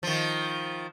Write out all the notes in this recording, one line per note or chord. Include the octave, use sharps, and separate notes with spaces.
D#3 F3